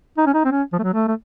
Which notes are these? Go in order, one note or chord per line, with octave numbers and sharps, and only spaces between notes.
D#4
C#4
D#4
C4
C#4
F3
A3
F#3
A3
A3